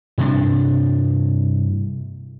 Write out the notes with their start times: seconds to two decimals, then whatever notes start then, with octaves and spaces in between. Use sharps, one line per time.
0.18 G2 C3 D4